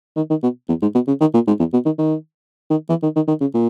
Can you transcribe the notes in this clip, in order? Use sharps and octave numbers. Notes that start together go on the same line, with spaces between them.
D#3
D#3
B2
E2
G#2
B2
C#3
D#3
A#2
G#2
E2
B2
D#3
D#3
D#3
E3
D#3
D#3
D#3
C#3
A#2